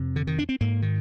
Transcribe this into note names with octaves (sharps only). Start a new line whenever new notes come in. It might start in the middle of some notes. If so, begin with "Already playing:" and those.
Already playing: F2 C3
D3
D#3
D4
C4
G#2 A#3
D#3